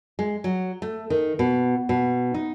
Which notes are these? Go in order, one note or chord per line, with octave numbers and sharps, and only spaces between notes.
G#3
F#3
A3
D#3
B2
B2
D#4